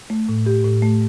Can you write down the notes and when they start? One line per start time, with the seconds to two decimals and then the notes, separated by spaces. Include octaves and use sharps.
0.10 A3
0.29 A2
0.46 G4
0.64 A2
0.82 A3